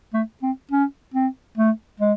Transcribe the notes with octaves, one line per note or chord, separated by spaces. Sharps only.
A3
C4
C#4
C4
A3
G#3